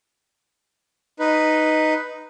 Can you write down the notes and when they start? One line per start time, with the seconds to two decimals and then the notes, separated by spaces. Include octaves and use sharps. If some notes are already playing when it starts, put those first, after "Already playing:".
1.19 D#4 B4